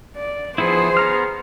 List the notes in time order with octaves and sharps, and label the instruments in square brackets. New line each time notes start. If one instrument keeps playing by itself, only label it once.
[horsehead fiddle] D5
[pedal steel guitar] F3 B3 E4 [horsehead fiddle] G#4 C5
[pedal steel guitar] B3 A#5 F6